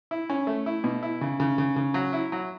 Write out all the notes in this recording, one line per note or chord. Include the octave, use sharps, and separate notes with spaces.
E4
C#4
A3
E4
B2
E4
C#3
C#3
C#3
C#3
F#3
E4
F#3